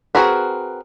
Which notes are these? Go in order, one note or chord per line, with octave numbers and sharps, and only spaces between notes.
C4 F#4 G#4 A#4 B4